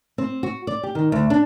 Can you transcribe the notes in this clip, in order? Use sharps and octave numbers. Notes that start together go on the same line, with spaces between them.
C4
F#4
D5
G4
D#3
D2
D4